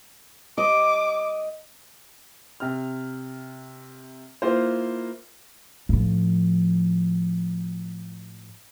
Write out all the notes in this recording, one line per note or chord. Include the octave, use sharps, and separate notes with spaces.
D#5 D6
C3 F6
A#3 E4 F4 C5
A2 F3